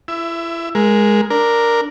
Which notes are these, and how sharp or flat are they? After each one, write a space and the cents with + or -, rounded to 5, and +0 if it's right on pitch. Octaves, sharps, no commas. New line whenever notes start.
E4 +35 E5 +15
G#3 +0 A#4 +15
D4 +0 A#4 +0